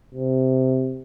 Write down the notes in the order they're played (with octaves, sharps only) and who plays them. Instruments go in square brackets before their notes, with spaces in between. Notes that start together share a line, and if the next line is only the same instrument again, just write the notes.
[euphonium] C3